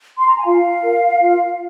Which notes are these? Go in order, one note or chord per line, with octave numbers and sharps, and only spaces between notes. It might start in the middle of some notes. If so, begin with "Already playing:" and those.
C6
A#5
G#5
F4 F5
A#4
F4